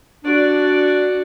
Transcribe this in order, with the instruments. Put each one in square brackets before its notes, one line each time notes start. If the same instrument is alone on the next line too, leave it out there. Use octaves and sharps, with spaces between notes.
[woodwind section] D4 [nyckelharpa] F#4 D5